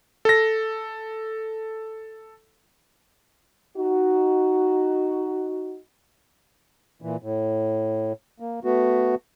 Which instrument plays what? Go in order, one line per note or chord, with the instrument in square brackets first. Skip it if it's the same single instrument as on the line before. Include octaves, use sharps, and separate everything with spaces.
[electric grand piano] A4 A#6
[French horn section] D#4 F#4
[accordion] A#2 E3
A2
A#3
A3 B3 F#4